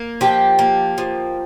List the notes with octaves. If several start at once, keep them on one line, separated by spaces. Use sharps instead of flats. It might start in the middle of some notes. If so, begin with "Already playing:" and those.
Already playing: A#3
F3 G4
A#3
F3